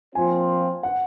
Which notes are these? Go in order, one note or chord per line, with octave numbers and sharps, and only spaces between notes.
A#2 F3 C4 F4 C5 G#5
F#5